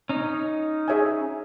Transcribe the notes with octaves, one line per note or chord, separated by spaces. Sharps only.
C#4 D#4
G#4 C#5 E5 G#5